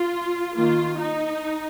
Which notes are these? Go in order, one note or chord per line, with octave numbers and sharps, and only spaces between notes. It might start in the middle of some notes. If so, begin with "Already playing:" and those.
Already playing: F4
D#3 A#3 F4
D#4